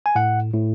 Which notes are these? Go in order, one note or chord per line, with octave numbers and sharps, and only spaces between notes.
G#5
A2 F#5
A2